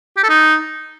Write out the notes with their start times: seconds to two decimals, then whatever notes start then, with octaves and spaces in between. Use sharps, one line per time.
0.17 G4
0.23 A4
0.29 D#4